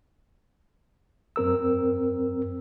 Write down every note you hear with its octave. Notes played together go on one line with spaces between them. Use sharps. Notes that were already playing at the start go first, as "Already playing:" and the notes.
F#2 C4 A#4 E6